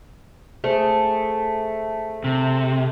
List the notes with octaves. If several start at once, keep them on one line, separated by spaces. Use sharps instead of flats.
A3 G#4 C5
C3